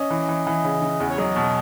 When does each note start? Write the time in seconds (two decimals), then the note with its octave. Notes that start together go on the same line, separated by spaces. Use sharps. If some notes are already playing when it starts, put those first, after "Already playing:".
Already playing: C#4 D#5
0.10 E3
0.29 E3
0.47 E3
0.64 C#3
0.82 C#3
1.00 E2
1.10 C#5
1.18 F#3 D#5
1.36 B2